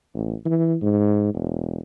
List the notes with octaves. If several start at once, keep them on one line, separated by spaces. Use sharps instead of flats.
A1
E3
G#2
E1